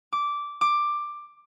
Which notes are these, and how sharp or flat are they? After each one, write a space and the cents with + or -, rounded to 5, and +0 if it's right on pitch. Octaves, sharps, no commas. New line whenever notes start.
D6 -10
D6 +10